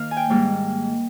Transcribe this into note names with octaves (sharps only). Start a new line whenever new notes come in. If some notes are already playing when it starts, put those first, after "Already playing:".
Already playing: D#3 A#3 F5
G#5
G5
G#2 G3 A#3